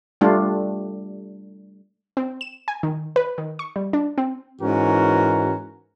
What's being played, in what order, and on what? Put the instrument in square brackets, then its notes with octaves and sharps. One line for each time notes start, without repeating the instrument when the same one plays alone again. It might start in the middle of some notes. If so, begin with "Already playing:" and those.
[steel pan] G3 A3 D4 F4
[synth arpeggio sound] C4
E7
G#5
D#3
B4
D#3
C#6
G3
D4
C4
[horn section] G#2 E3 C#4 F#4 A#4